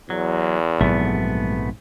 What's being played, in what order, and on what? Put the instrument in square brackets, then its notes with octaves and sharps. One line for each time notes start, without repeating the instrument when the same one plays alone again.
[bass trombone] E2 [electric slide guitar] F#3
[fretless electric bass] A#1 G#2 C3 [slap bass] F#3 G#3 [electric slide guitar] A3 B3